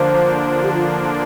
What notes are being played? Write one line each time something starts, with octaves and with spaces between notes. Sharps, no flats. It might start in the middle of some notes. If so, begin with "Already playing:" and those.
Already playing: D3 F3 A#3 D4 C5
G4
F4
F4